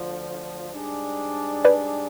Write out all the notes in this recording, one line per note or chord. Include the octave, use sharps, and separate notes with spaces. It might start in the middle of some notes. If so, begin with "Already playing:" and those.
Already playing: D2 D3 F3
G#2 G3 D4 G#4
B4 D5